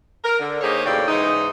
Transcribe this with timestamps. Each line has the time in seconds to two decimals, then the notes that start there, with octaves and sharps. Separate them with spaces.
0.24 A#4
0.39 D3
0.61 A#3 D#4 G4 G#4 C5 C#5
0.85 D#2 A2 C#3 F#4 G4 D5
1.07 G#2 C#3 E3 D#4